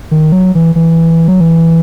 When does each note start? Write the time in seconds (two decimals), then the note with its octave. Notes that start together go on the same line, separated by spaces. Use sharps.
0.11 D#3
0.32 F#3
0.55 E3
0.76 E3
1.28 F#3
1.41 E3